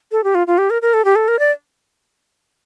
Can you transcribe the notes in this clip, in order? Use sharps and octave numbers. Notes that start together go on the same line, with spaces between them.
A4
G4
F4
F4
G4
A#4
A#4
A4
G4
A4
A#4
D5